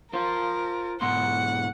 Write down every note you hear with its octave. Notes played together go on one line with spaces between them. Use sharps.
F4 A#4 C5
G#2 B2 F#5 C6